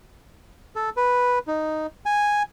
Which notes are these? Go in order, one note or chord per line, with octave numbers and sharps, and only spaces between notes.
A4
B4
D#4
G#5